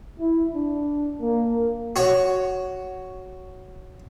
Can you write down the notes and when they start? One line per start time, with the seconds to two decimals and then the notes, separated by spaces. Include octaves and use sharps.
0.19 E4
0.54 D4
1.21 A#3
1.96 F#4 C#5